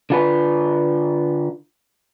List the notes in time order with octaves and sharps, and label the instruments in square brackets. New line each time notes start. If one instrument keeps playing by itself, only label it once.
[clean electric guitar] D3 F4 B4